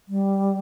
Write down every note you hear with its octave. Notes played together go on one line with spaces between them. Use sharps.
G3